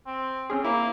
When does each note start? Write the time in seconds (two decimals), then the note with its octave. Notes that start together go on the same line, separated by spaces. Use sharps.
0.07 C4
0.50 C4 C#4 G#4
0.64 A#3 E4